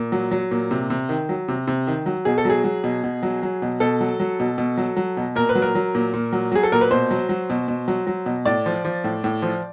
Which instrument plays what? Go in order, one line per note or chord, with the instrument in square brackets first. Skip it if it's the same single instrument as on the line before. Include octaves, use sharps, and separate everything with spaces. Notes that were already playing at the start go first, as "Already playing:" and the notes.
Already playing: [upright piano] A#2
F#3
F#3
A#2
C3
C3
D#3
F#3
C3
C3
D#3
F#3
B2 G#4
A4
F#3 G#4
F#3
B2
B2
F#3
F#3
B2
B2 A4
F#3
F#3
B2
B2
F#3
F#3
B2
A#2 A#4
B4
F#3
A#4
F#3
A#2
A#2
F#3
F#3 G#4
A4
A#2 A#4
B4
B2 C5
F#3
F#3
B2
B2
F#3
F#3
B2
A2 D5
F3
F3
A2
A2
F3